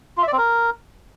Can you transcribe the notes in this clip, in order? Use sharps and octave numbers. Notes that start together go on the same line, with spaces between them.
F4
E5
D5
C4
A#4